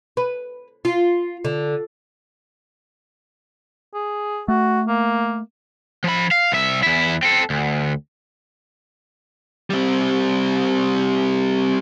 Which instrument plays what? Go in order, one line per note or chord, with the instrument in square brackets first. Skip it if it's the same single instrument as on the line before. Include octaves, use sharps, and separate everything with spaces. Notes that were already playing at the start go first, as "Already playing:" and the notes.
[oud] B4
F4
D3
[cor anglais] G#4
[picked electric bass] A3 [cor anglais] F#4
[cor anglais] A#3
[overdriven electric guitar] F3 B5
F5
C2 E5
E2 E4
C4 A4
D2
[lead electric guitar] G3 C4